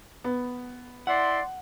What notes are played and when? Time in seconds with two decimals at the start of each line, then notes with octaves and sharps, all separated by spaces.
0.24 B3
1.07 E4 D5 F#5 C6